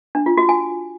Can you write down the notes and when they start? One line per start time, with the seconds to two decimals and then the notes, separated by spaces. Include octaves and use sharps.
0.15 D4
0.26 F4
0.37 F#4
0.49 G#5